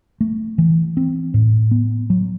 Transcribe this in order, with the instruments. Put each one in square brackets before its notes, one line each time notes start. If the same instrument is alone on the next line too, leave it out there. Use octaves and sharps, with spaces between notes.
[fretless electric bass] A3
E3
C4
A2
B3
F#3